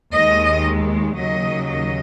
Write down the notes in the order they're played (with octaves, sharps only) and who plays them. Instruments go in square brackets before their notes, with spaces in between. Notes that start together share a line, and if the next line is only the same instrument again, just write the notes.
[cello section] D#2 D#3 G#3 D#5
D#2 C#3 F#3 A#3 D#5
D#5